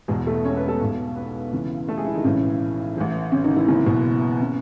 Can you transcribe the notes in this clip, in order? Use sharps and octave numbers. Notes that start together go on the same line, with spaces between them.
E1 E2 B2 G#3 G#4
A3 A4
C#4 C#5
B3 B4
A3 A4
B1 B2
B3 B4
C#2 C#3 E3
A3 A4
G#3 G#4
E3 E4
D#3 D#4
B1 A2 C#3 E3 C#4
A1 A2 E3
C#3 C#4
D#3 D#4
E3 E4
F#1 F#2 C#3 E3 C#4
B2 B3
C#3